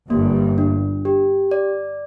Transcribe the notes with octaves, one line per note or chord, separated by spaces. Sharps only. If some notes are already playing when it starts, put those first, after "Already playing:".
G1 G2 A#3
D4
G4
D5